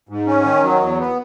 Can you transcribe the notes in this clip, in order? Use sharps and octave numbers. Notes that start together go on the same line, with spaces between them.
G#2
C#4
D#3
F#3
E2
B3